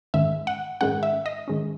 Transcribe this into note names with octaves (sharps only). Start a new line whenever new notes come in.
G#2 D#3 G#3 C#4 E5
F#5
G#2 D#3 G#3 C#4 F#5
E5
D#5
G#2 D#3 G#3 C#4